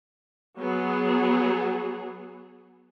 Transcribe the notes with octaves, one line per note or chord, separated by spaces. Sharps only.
F#3 B3 G#4